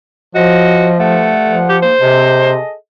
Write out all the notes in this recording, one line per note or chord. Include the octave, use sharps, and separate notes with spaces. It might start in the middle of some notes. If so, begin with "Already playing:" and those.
F3 C4 F#4 C#5 D#5
G2 D3 A3 F#5
F3
G4
G#2 A#3 C5
C3 G#4 A4 D#5